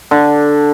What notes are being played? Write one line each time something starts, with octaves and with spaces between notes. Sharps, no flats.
D3